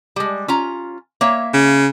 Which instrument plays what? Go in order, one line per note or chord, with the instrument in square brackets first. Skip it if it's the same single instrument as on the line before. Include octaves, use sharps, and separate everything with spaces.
[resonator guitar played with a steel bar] G3 G#3
C#4 F4 A#5
A#3 C#5 E5
[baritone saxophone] C#3